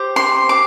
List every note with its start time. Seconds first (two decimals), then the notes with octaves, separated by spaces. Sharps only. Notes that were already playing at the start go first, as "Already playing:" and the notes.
Already playing: G4 C5
0.16 C6
0.49 D6